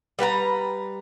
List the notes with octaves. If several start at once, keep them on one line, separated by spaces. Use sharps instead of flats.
G3 B4 F#5 A#5